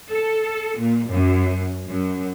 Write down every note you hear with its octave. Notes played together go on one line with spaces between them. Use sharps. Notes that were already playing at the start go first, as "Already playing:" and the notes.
A4
A#2
F#2
F#2